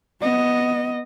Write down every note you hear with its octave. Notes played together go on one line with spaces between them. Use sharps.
B3 D#5